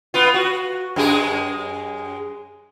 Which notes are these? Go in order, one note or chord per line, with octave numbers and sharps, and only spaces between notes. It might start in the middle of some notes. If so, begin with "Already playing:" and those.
B3 F4
F#4
F#2 G#3 G#4